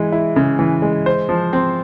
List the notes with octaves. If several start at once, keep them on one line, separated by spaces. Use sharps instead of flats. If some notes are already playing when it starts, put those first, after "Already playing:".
Already playing: E3 G#3
E4
C#3
E3
G#3
C5
F3
C4